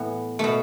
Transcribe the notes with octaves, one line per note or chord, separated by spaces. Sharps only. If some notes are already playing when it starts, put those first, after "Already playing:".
Already playing: A2 E3 B3
B2 A3